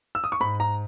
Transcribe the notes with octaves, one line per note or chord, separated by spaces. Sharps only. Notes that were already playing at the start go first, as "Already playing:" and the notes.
E6
D#6
C#6
G#2 B5
A#5